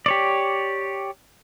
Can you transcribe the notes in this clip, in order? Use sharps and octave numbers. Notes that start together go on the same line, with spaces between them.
G4 C#5 D5